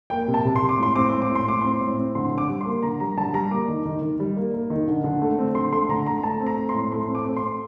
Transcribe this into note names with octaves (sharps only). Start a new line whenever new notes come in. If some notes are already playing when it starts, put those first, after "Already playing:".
A#3 G5
C3
A5
C3
C6
C3
D6
A2 C6
C4 D6
A2 C6
D6
A2
C6
A2 D6
C4 C6
A2
C4
D3 C6
D3
D6
G3
C6
A#3
D3 A#5
G3 A#5
D3 A5
G3 A#5
A#3 D6
D#3
D#3
D#3
G3
A#3
A#3
D#3
D3
D3
A3
C4
D3 C6
A3 C6
D3 A#5
A3 A#5
A3 A5
C4
A#5
C4
C6
A2
A3 C6
C4
D6
C4
C6
C4